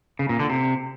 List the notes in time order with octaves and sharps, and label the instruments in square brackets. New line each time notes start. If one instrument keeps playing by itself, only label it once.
[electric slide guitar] C#3
A#2
D3
C3